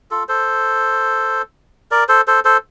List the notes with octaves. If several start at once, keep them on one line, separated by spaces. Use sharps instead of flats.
F4 A4
A4 C5
A#4 D5
A4 C5
A4 C5
A4 C5